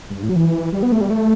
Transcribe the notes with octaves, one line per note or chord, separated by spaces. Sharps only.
G2
A2
F#3
E3
G3
B3
A3
G3
A3